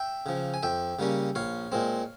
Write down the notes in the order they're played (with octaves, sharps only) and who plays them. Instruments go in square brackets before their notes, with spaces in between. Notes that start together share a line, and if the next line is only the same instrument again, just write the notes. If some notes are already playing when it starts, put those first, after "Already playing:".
Already playing: [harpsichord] E5 G5
C#3 F3
G#5
F2 E5 G5
C#3 G3 A#3 C#4
A#1 C#5 F5
A#2 G#3 C4